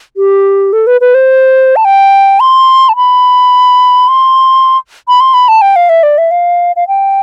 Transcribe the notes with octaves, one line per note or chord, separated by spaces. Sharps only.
G4
A4
B4
B4
C5
A5
G5
C6
A5
B5
C6
B5
C6
B5
A5
G5
F5
E5
D5
E5
F5
F5
G5